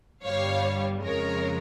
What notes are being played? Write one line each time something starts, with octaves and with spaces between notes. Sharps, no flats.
G1 G2 G3 C#5 F5
F2 C#3 F3 G#3 A#4 C#5